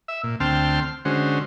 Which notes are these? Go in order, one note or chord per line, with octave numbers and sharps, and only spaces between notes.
E5
A#2
D2 C4 G5 A5 C6 F6
D3 G#3 C#4 F#4 C5